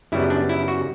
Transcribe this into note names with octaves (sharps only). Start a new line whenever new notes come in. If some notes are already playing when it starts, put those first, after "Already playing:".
F#2 C#3 G3 B3 E4
D4
E4
F#4